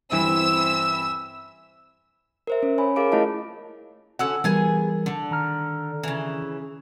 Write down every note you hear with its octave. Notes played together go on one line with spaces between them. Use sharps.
G2 E3 C4 E5 E6
A#4 C5 E5
C#4
C#5 G#5 B5
G#4 A#4 F5 D6 D7
A3 E4 F4 D#5 F5 A5
D3 C#4 F#4 F#5 E6
E3 G3 B3 G#4 A#4 G#5
D3
D#3 A#5 F6
C#3 E3